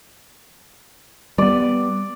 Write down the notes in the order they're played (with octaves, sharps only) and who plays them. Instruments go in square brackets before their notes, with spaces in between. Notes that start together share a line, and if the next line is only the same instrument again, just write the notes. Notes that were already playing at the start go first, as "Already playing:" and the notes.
[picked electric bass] G3 B3 [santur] D5